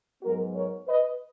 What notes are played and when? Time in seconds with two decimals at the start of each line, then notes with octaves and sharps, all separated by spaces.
0.22 G#2 F#3 B3 F#4 A#4
0.54 A#4 C#5
0.87 B4 D#5